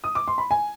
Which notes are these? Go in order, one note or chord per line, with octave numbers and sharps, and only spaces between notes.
D#6
D6
C6
B5
G#5